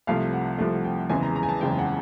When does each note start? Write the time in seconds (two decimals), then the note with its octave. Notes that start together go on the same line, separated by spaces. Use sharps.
0.07 C2 C3 F3 A3 F5
0.33 F#5
0.58 C2 C3 F3 A3
0.84 G5
1.10 F#1 E2 C#3 E3 G#3 G#5
1.23 A#5
1.36 A#5
1.43 G#5
1.49 A5
1.61 F#1 E2 C#3 E3 G#3 G5
1.79 F#5